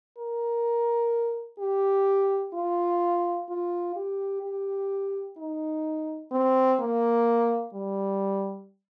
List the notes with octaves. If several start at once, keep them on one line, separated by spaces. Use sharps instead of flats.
A#4
G4
F4
F4
G4
G4
D#4
C4
A#3
G3